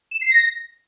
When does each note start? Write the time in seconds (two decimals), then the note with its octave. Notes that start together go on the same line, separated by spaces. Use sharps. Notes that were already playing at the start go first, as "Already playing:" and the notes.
0.11 E7
0.21 C7
0.31 A#6